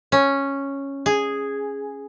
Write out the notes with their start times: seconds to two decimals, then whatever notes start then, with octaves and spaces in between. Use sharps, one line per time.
0.12 C#4
1.06 G#4